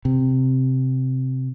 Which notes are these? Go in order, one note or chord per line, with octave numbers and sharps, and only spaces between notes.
C3